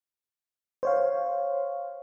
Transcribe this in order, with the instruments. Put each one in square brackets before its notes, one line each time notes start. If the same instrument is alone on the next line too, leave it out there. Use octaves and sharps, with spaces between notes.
[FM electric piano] C5 C#5 F5